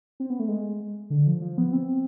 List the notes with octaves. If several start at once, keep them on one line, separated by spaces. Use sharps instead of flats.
C4
B3
A3
G#3
D3
F3
F3
B3
C4